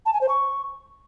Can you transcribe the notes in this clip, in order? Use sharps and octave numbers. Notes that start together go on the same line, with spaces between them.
A5
G#5
C5
C#6